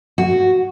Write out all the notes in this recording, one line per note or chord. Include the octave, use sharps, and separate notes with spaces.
F#4